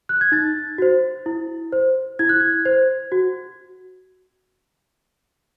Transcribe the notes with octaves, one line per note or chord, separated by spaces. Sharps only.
F#6
G#6
D#4 A6
F#4 C5
E4
C5
E4 G#6
F#6
G#6
C5
F#4